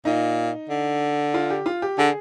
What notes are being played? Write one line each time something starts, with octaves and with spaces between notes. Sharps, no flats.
A#2 D#4
D3
F4
G4
F4
G4
D3 G#4